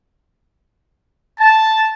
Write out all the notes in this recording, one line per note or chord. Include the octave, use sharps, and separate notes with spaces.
A5